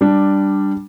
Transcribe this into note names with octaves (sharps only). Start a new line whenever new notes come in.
G3 D4